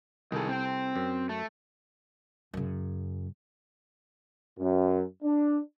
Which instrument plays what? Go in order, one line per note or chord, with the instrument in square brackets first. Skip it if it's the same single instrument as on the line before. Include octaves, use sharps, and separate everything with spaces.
[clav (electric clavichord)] C2 A4 [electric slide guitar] D#3 G#4
[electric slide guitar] C4 G5
[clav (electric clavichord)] F#2
[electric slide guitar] A3
[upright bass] F#2 C#3
[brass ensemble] F#2
D4